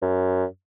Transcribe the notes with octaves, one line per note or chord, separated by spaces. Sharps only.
F#2